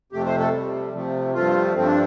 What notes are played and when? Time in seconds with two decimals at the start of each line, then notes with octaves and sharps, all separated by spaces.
0.12 F2 C3 A3 G4
0.26 C5
0.40 A4
0.53 C3 G3
0.94 C3 F3 A3
1.34 G2 F3 A3 F4
1.75 G2 F3 A3 C4
1.87 D4